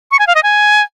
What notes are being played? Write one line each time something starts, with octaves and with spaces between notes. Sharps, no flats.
C#6
G#5
F5
D#5
G#5